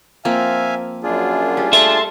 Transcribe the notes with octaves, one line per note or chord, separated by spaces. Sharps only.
F3 A#3 C4 E5 F5 G#5
F#2 D4 F4 G#4
G3
A4 E5 A5 C6